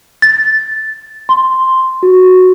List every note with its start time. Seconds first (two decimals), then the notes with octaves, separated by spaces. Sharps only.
0.22 A6
1.29 C6
2.03 F#4